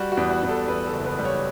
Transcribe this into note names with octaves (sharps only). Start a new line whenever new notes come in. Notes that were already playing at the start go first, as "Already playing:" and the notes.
Already playing: G3 F#4
F#4
E2
F#4
E2
A4
E2 B4
A4
F#1
B4
G3
C#5